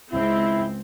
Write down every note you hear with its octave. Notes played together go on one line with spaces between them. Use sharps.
C#2 C4 E4